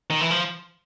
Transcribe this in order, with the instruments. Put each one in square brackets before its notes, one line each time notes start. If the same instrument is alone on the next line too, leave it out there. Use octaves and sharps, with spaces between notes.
[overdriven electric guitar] D#3
E3
F3